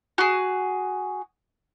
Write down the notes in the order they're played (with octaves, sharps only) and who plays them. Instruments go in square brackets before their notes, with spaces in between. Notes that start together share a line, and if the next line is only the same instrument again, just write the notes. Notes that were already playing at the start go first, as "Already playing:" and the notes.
[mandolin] F#4 G#4